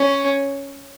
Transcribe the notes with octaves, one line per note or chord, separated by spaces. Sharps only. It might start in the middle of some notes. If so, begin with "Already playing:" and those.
Already playing: C#4